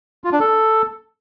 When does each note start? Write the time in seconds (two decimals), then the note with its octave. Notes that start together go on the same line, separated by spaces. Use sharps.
0.24 F4
0.32 D4
0.40 A4